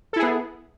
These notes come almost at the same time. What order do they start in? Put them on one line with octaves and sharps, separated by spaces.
A4 E4 G#4 B3